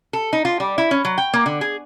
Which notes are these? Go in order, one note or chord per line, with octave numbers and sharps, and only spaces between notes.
A4
D#4
F4
G3
E4
C#4
F#3
G5
A#3
D3
G#4